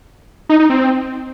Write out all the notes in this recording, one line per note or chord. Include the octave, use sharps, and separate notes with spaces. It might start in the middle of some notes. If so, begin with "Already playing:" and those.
D#4
D#4
C4